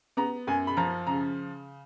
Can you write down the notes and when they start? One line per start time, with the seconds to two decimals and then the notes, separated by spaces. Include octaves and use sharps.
0.17 B3 A#5
0.47 F#2 G#5
0.67 B5
0.77 F3 A#5
1.07 C#3 A#5